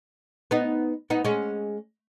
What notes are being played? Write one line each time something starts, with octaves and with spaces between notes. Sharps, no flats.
B3 D#4
B3 D#4
G#3 C#4